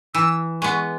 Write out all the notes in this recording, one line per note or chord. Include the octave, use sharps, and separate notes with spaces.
E3 E6
G#3 B3 C#6